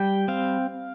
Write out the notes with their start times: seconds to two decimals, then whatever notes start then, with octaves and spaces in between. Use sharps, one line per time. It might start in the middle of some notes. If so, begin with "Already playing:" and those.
Already playing: G3 G5
0.28 C4 F5